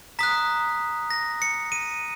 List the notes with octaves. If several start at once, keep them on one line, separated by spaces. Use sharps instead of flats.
A#5 D#6 F#6 B6
A#6
C#7
D#7